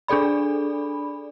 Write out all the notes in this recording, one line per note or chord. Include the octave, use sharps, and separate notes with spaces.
D4 G#4 A4 D5 B5